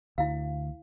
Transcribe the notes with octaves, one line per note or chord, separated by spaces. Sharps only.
D2 E4 F5